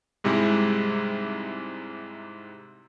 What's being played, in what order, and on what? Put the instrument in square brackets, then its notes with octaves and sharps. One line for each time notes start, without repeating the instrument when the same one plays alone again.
[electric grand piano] G#2 C3 G3 G#3 E4